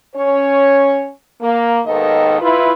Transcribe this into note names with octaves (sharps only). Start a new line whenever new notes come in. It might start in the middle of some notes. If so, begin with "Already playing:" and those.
C#4 C#5
A#3
D#2 G#2 D#3 B3 A4 D#5
E4 F4 B4